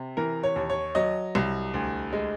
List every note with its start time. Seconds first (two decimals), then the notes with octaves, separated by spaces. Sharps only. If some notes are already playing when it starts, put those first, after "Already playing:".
Already playing: C3
0.17 E3 A#4
0.43 C#5
0.56 D#2
0.70 C#5
0.95 F#3 D#5
1.35 C2
1.74 D2
2.13 G#3